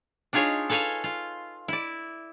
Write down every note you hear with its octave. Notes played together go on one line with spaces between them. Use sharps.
D4 D#4 F4 G#4 C#5
A4 B4 C#5 F5 G#5
F4
E4 D5